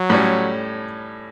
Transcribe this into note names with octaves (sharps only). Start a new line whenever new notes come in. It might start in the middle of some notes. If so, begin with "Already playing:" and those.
Already playing: F#3
A2 G3 C#4